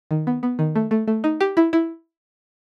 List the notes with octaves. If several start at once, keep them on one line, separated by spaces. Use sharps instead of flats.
D#3
B3
B3
D#3
A3
A3
A3
D#4
G4
E4
E4